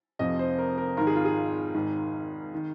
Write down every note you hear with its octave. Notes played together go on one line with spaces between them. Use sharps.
F1 F2 C3 F3 D#5
C5
A#4
A#4
G#1 G#2 D#3 A#4
G#4
F4
G#4
G#1 G#2 D#3
D#3